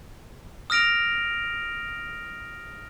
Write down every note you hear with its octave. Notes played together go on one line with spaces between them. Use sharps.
D#6 F6 A#6 D7 F7